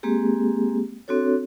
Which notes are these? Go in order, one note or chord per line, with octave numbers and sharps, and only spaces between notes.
G#3 A#3 C4 G4 G#4
C4 D4 F#4 A4 C#5